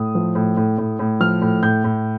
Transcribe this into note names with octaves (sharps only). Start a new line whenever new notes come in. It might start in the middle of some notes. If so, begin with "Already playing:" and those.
Already playing: A2 D#6
F3
A2
A2
A2
A2
F3 F6
A2
A2 G6
A2